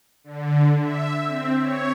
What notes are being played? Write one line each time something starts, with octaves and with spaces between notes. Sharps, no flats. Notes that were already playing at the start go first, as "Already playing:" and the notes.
D3
E5
C4
C#5